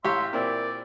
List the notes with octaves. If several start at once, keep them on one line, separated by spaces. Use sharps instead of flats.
A1 G4 C#5 E5 F5 C6
A#2 C4 E4 A#4 D5